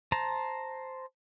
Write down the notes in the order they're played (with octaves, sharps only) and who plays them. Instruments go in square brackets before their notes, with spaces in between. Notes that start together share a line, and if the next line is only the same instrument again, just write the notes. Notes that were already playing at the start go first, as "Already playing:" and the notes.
[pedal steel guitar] C5 A5 A#5